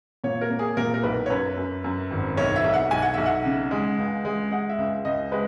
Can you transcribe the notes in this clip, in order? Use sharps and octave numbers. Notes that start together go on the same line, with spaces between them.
A#2 C#5
A#4
A#3
G#4
A#2 A#4
A#4
B1 B4
C#5
F#2 B4
F#2
F#2
G#1
B1 C#5
E5
B1
F#5
B1 G#5
F#5
B1 E5
F#5
C#3
G#3
C#2
G#3
G#3 F#5
E5
C#2
C#2 D#5
G#3 B4